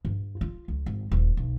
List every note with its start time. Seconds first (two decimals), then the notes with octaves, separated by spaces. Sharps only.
0.05 G2
0.41 F4
0.68 C#2
0.86 G#1
1.11 D#1
1.37 B1